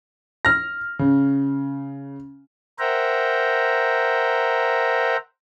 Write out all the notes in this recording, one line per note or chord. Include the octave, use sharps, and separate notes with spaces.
F6 A#6
C#3
A#4 C5 E5 F#5 G5 A#5